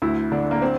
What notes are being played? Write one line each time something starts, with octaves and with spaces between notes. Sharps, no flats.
D2 E4
D3 D4
A#3
C4